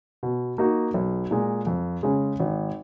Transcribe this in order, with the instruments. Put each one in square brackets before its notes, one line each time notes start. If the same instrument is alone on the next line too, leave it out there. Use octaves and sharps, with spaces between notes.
[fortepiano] B2
A#3 D#4 F#4
B1
A#2 G#3
F2
C#3 G#3
G#1